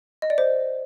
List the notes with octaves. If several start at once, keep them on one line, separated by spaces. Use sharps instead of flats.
D#5
D5
C5